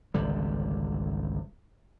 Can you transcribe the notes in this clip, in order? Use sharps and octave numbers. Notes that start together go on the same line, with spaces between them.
G#1 C#2 D3 G3